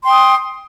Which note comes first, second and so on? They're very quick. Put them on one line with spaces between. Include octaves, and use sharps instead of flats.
C6 G5 D#6